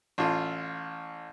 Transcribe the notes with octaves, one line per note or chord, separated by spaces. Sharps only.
A1 F4